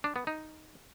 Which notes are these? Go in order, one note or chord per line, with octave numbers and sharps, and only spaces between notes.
D4
B3
D#4